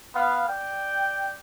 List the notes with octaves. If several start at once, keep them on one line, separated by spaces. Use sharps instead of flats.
B3 F5
D5 G5